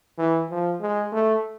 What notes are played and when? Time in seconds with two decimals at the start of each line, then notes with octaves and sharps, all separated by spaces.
0.18 E3
0.50 F3
0.81 G#3
1.12 A3